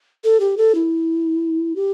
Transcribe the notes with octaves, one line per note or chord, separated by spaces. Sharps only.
A4
G4
A4
E4
G4